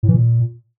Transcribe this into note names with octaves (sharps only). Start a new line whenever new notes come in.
A2
E3
A#2